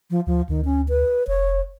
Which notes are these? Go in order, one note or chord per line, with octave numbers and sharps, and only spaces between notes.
F3
D2 F3
D2 D#3
C#4
B4
F1 C#5